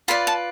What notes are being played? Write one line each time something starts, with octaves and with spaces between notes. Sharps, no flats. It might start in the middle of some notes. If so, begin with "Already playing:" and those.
F4 B4 D5 B5
A5